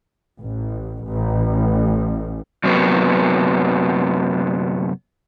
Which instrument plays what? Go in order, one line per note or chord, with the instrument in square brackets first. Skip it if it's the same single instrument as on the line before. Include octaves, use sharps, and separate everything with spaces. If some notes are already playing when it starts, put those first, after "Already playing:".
[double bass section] A1
A1
[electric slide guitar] F#2 C3 F#3 A#3 B3